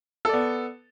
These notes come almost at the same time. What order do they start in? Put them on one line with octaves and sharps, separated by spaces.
A4 D5 B3